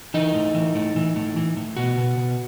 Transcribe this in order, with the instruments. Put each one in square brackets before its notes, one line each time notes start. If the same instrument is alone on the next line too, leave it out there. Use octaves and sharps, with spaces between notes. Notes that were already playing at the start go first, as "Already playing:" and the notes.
[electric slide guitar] E3 D#4
A2
E3
A2
E3
A2
E3
A2
B2 F#4
B2
B2